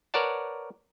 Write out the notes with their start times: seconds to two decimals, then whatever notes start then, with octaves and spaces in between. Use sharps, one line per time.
0.14 A#4 B4 C#5 D5 F#5 A5